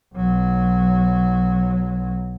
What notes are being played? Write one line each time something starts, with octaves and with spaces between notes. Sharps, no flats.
B1 F#3